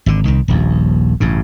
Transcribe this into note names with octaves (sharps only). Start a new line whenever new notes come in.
G#1 D3
C2 D#3
D#1 A#1 D#2
A1 G2 C#3